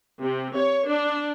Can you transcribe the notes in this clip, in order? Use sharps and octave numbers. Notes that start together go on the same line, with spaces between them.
C3
C#5
D4